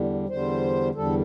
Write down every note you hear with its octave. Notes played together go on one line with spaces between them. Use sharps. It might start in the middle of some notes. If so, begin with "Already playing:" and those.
Already playing: E2 D3 G3
E2 D3 G3 C5
E2 D3 G3 A4